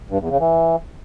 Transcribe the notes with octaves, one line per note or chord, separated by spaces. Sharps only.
G2
E2
C#3
E3